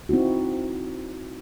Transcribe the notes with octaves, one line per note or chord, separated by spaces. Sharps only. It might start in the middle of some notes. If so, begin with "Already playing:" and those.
C4 D#4 E4 F#4